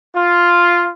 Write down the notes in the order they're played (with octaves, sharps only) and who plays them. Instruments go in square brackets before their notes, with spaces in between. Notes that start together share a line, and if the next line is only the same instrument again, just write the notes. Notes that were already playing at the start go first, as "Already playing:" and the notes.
[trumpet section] F4